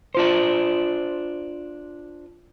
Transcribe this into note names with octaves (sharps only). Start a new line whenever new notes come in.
D4 F4 C5